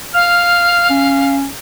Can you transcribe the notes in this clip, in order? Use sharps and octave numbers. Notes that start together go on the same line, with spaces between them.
F5 F6
C#4